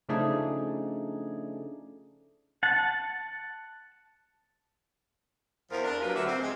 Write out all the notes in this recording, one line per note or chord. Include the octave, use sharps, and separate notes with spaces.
C#3 F3 A3 D4 D#4 G#4
F#5 A5
E2 F3 A#4
D4 A#4
F#3 A#3 F4 G4 A#4 B4
D2 D3 F#4 D5 E5
C4
G#3